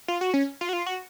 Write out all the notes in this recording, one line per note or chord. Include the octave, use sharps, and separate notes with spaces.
F4
F#4
C#4
F4
F#4
F4
F#4